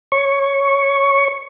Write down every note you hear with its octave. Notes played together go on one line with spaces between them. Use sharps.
C#5 C#6